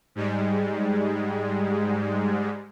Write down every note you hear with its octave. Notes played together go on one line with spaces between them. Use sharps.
G#2 G3 G#3